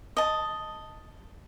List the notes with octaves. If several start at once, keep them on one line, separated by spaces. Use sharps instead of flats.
D#5 A5